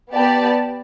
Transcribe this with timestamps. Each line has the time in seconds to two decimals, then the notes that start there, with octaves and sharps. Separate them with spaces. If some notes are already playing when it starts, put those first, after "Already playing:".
0.13 B3 G4 D5 A5